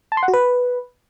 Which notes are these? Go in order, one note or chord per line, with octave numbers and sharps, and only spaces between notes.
A5
C6
F#5
F#4
B4